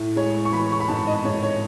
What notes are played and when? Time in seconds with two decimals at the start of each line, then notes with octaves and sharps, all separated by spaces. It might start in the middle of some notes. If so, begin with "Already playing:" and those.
Already playing: A2
0.16 G#3 C#5
0.45 C#6
0.52 E3 B5
0.72 C#6
0.80 B5
0.88 G#2 A5
1.07 D#5
1.24 G#2 C#5
1.43 C#5